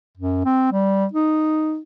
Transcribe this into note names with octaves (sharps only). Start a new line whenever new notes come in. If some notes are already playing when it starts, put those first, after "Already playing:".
F#2
C4
G3
D#4